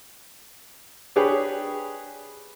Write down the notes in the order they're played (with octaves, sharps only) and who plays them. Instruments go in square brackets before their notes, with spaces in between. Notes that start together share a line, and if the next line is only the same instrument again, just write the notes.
[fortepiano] D4 G4 G#4 B4 C#5